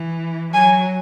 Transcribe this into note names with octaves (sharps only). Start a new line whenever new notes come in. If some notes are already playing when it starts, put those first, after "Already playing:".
Already playing: E3
F#3 G#5